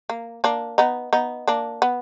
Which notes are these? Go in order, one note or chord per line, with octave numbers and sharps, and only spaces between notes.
A#3
A#3 D4
B3 D#4
B3 D#4
A#3 D4
B3